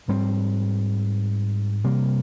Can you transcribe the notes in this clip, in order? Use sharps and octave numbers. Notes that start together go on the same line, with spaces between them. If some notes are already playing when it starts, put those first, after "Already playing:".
G#2 G3 C4
C3 G3 A#3